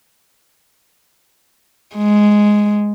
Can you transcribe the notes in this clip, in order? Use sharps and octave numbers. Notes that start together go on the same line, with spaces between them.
G#3